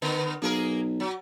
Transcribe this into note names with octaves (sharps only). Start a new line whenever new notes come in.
D3 B3
B1 A#3 G#4 A#4
F#3